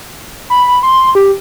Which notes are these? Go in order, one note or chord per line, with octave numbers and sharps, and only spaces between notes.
B5
C6
G4